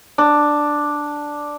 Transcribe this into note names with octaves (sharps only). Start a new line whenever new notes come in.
D4